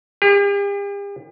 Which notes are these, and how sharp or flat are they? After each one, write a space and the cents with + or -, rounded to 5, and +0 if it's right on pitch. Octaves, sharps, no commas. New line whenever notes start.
G4 +45